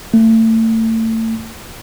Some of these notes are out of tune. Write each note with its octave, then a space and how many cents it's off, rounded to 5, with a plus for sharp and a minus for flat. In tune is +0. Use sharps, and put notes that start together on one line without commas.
A3 +30